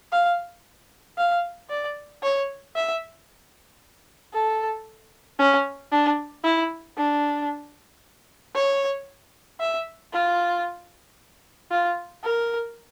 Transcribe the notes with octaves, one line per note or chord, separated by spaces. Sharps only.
F5
F5
D5
C#5
E5
A4
C#4
D4
E4
D4
C#5
E5
F4
F4
A#4